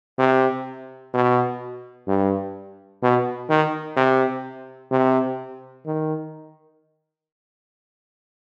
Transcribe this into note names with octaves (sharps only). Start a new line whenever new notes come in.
C3
B2
G2
B2
D#3
C3
C3
D#3